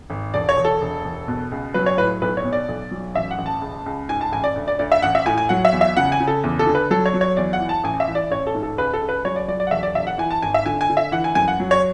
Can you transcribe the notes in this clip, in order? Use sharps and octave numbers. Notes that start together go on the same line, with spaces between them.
G#1
E1 D5
C#5
E1
A4
E1
E1
B2
C#2
F#3 B4
C#5
A2 B4
B1 B4
C#5
B2
D5
B1
F#3
A1 E5
F#5
A1
A5
C#2
C#2
G#2 G#5
A5
A1 G#5
D5
D2
D5
D2 D5
E5
A1 F#5
E5
A2 G#5
G#5
F#3 F#5
E5
E2
E5
C#3 F#5
G#5
C#3
A4
E2
A4
D3
B4
F#3 A4
C#5
F#3
C#5
E2 D5
F#5
E3
A5
A1 G#5
E5
E3
D5
A1 C#5
A4
G#2
A4
C#2 B4
A4
C#2
B4
F#3 C#5
D5
F#3 D5
D5
F#5
E1 E5
D5
E1 E5
F#5
E3 G#5
A5
G#1 G#5
E5
D3 G#5
G#5
D3
E5
E3 F#5
G#5
F#2 G#5
F#5
F#3
C#5